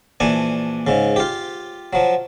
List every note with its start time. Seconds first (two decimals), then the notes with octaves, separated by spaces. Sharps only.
0.20 A#1 E3 D4 G#5
0.87 G#2 C#3
1.16 F4 G4
1.93 F3 F#3